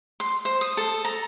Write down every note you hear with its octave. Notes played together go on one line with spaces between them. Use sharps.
C6
C5
D#6
A4
A#5